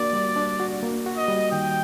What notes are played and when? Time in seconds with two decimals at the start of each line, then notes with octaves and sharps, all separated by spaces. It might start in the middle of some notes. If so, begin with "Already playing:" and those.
Already playing: A#3 D4 F#4 D5
0.13 G3
0.36 D4
0.60 F#4
0.83 A#3
1.06 F#4
1.17 D#5
1.28 G3
1.52 D#3 G5